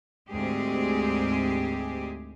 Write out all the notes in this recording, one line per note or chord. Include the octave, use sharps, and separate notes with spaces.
D2 G#2 G#3 C4 G4 G#4